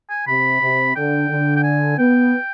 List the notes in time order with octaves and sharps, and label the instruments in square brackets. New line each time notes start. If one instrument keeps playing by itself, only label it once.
[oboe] G#5
[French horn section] C3 [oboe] B5
[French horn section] C3
[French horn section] D3 [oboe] G5
[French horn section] D3
[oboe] G5
G#5
[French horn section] B3 [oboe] G5